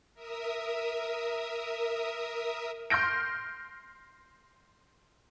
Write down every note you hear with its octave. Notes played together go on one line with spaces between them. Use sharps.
A#4 E5 D#6
C6 F6 G6 A#6 D7